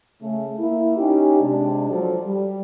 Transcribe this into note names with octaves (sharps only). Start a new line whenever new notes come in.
C#3 A3
A#3 E4
C#4 D#4 G4
C3 G#3 D4
F3 F#3 A4 C5 D5
G3